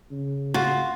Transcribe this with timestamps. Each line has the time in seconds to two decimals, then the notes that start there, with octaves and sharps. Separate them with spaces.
0.11 C#3
0.54 F4 F#4